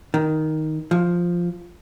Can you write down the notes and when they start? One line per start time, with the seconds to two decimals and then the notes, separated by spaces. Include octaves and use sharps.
0.14 D#3
0.91 F3